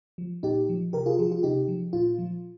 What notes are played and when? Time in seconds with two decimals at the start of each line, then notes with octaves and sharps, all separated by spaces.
0.18 F3
0.43 A#2 D#4 G4
0.69 F3
0.93 C3 G4 A#4
1.06 F4 G#4
1.19 F3 F4 G#4
1.32 F4
1.43 C3 D#4 G4
1.68 F3
1.93 A#2 F4
2.18 F3